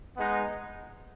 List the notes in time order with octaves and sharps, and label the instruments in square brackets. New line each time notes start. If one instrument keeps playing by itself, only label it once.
[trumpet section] G#3 B3 D#4 F#5